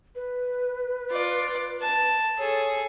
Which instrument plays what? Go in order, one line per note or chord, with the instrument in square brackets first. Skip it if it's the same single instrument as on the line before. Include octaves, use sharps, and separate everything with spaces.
[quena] B4
[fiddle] F4 D5
A5
[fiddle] G#4 A4 [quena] C#5